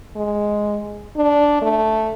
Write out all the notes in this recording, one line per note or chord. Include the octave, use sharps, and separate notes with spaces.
G#3
D4
A3